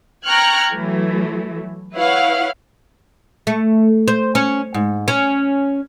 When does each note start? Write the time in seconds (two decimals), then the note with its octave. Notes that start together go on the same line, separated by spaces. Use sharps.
0.25 G5 A#5 C#6 F6 F#6 G#6
0.72 E3 F#3 A3
1.94 E4 B4 C#5 F5 F#5
3.47 A3
4.08 C5
4.35 C#4
4.74 G#2
5.08 C#4